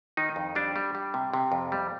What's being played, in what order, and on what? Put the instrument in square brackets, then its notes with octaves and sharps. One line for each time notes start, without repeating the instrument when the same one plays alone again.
[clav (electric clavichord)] D#3 D#4
F2
G3 D4
G3
G3
C3
C3
F2
G3